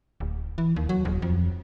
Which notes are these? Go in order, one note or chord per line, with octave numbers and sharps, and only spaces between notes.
D1
E3
D#2
F#3
D#1
F2